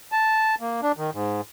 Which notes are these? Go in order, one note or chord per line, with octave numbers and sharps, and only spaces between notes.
A5
A#3
D4
D#3
G#2